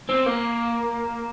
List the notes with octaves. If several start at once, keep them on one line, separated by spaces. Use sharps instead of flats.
C4
A#3